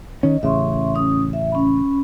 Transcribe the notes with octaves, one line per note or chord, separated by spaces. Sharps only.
D#3 C#4 D#5
A1 C#3 E5 C6 C#6
C#4 D#6
E5
C#4 B5